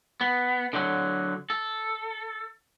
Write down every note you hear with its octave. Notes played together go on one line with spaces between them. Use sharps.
B3
D3 F#3
A4